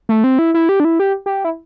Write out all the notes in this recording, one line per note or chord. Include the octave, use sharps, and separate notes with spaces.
A3
C4
E4
E4
G4
D4
E4
G4
G4
E4